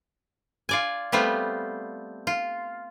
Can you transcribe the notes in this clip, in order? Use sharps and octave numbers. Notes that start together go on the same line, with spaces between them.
F4 D5 G#5
G3 A3 B3 C4 F4
F4